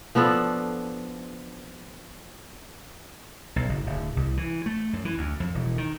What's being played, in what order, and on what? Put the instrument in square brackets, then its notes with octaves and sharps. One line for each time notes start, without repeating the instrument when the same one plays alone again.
[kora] F3 B3 D4 A4
[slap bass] B1
F#1
D1
C2
E3
A3
F#2
E3
D2
F2
E1
D#3